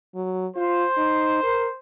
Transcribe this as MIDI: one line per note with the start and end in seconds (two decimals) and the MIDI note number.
0.15 0.47 54
0.56 0.85 65
0.56 1.79 72
0.97 1.43 63
1.43 1.67 70